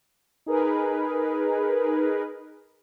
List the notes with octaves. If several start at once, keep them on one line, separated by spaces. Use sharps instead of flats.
D#4 G#4 A#4 B4